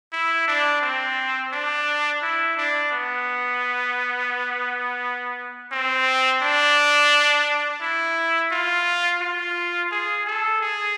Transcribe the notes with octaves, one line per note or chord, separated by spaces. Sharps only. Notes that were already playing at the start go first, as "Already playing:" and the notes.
E4
D4
C4
D4
E4
D4
B3
C4
D4
E4
F4
F4
G#4
A4
G#4